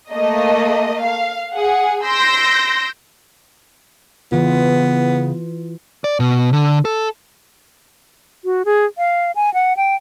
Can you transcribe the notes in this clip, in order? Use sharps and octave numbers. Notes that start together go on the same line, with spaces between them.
A3 A#3 D#5
F5
G#4 F#5
C6 E6 G6 A#6 D7
C#3 E3 B3 F4
D5
B2
D3
A4
F#4
G#4
F5
G#5
F#5
G5